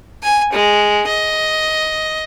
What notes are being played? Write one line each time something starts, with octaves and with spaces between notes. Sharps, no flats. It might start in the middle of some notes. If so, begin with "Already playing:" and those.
G#5
G#3
D#5